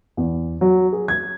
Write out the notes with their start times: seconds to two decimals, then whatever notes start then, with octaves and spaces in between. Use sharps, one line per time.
0.17 E2
0.61 F#3
0.93 G#4
1.08 G#6